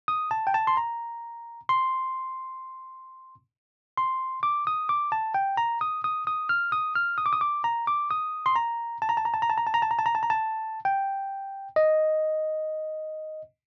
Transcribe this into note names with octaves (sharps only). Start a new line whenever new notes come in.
D#6
A5
G5
A5
C6
A#5
C6
C6
D6
D#6
D6
A5
G5
A#5
D#6
D#6
D#6
F6
D#6
F6
D#6
D6
D#6
D6
A#5
D6
D#6
C6
A#5
A5
A#5
A5
A#5
A5
A#5
A5
A#5
A5
A#5
A5
A#5
A5
A#5
A5
A#5
A5
G5
D#5